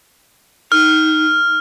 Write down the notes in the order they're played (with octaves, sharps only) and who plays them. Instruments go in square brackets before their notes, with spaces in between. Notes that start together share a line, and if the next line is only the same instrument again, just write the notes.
[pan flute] D#4 [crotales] F6